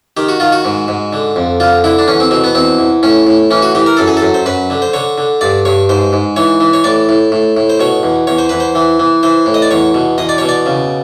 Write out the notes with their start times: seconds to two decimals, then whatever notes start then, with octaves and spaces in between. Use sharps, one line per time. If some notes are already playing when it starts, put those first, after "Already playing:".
0.17 D#3 G4
0.29 F#4
0.40 D#3 F4
0.52 F#4
0.65 G#2
0.88 G#2
1.13 D3
1.36 F2
1.60 D3 F4
1.84 D3 E4
1.99 D4
2.08 E2 C#4
2.20 C4
2.31 B2 C4
2.44 B3
2.55 E2 C4
2.79 E2
3.03 A2 C#4
3.27 A2
3.51 E3 C#4
3.62 F#4
3.75 E3 G4
3.86 A#4
3.97 F#2 A4
4.08 G#4
4.17 A4
4.22 F#2
4.34 C5
4.46 F#2 B4
4.70 D3
4.82 C5
4.93 D3 C#5
5.18 D3
5.41 G2 D5
5.65 G2 C#5
5.89 G#2 C5
6.13 G#2
6.36 E3 C#5
6.60 E3
6.73 C#5
6.84 A2 D5
7.09 A2
7.32 A2
7.57 A2
7.70 C5
7.80 B2 C#5
8.03 E2
8.27 E2 C#5
8.38 C5
8.49 E2 B4
8.60 C5
8.75 E3
9.00 E3
9.23 E3 C5
9.46 A2
9.54 D#5
9.62 D5
9.71 E2 C#5
9.94 B2
10.18 E2 D#5
10.29 D5
10.38 B2 C#5
10.49 D5
10.66 C#3